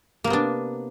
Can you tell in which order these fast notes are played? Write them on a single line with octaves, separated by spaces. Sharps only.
A#3 C3 B3 D4